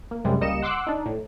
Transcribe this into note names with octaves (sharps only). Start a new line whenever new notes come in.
A#3
F#2 C3 G3 G#3
C#2 G3 A#3 D#5 C#7 E7
F#5 C6 D6 E6 F#6
D4 D#4
A2